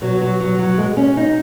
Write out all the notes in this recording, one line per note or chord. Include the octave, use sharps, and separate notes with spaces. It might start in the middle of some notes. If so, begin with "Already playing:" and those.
B2 F#3
F#3
F#3
F#3
B2 G#3
C#4
D#4